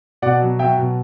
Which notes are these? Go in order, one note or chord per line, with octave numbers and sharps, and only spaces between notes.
B2 D5 F#5
F#3
F#3 E5 G5
B2